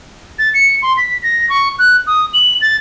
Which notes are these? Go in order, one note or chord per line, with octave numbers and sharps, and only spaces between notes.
A6
C#7
C6
B6
A#6
C#6
F#6
D#6
F#7
A6